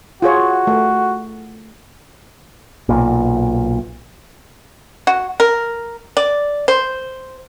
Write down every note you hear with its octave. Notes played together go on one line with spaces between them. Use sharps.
F4 F#4 G#4 C#5
A3
B1 A#2
F#4
A#4
D5
C5